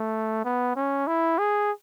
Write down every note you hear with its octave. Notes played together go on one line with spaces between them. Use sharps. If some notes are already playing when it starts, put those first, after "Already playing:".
Already playing: A3
B3
C#4
E4
G#4